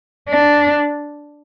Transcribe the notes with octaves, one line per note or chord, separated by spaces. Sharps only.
D4